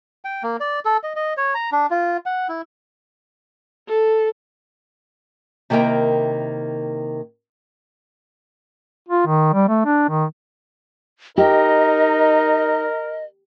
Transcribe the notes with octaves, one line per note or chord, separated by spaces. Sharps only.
G5
A#3
D5
A4
D#5
D#5
C#5
A#5
D4
F4
F#5
E4
A4
C3 D#3 A#3 E4 A#4 G5
F4
D#3
G3
A3
D4
D#3
D#4 G4 A#4 D#5